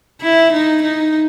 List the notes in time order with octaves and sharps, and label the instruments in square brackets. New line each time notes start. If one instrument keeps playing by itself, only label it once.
[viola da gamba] E4
D#4
D#4